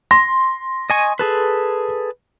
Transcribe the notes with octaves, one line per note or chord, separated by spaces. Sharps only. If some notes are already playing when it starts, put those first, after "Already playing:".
C6 A#6
D#5 G#5 C#6
G#4 A4 B4